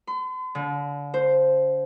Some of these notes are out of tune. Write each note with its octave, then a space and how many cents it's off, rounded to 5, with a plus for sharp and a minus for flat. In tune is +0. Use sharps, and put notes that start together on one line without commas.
C6 -45
D3 -35
C5 +0